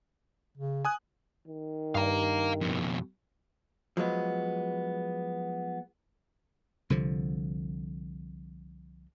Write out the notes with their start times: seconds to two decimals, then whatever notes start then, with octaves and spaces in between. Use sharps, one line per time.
0.57 C#3
0.85 G#5 D#6 F#6
1.48 D#3
1.95 G2 F5 A#5
2.61 F2 B2
3.97 F3 F#3 G#3 B3
6.90 C2 D3 F3